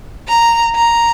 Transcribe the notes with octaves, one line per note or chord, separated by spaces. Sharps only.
A#5
A#5